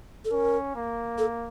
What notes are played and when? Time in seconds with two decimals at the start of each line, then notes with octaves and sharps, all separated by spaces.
0.25 A4
0.31 C#4 A#4
0.75 A#3
1.18 A4